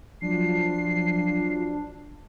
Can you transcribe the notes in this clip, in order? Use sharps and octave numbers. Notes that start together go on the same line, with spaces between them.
F3 F#3 D4 F4 C7